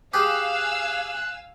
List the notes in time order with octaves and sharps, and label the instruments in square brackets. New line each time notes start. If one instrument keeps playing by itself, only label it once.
[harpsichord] G4 G#4 [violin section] F5 G#5 E6 [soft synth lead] F#6